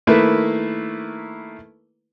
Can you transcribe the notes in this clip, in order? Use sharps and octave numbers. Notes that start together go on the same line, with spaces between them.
D#3 A3 A#3 E4 B4